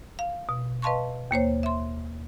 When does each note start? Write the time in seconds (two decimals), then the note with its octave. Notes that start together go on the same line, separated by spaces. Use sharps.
0.19 F5
0.49 B2
0.82 B4 D#5 F5 A5 C6 C#6
1.31 D#2 A#3 C5 C#5
1.63 E5 C6